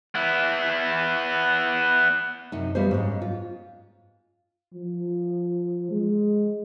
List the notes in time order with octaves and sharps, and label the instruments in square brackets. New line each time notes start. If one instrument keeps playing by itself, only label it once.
[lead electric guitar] B3 E4
[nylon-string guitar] F#2 C3 D#4
C#3 G3 B3 C5
G#2 G#3 C#4
F4
[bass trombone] F3
G#3